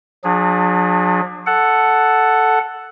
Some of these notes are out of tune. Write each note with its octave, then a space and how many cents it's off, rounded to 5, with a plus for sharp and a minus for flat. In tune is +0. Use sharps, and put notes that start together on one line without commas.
F#3 -45 D4 +30 G#4 +0
A4 +0 F#5 +0